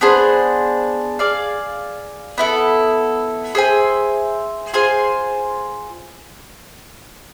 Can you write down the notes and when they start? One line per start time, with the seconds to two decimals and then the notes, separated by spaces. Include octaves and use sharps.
0.01 B3 D4 G#4 C5
1.19 G#4 D5 F5
2.38 B3 E4 A4
3.55 G#4 C5 E5 G#5
4.73 F4 G#4 C5 G#5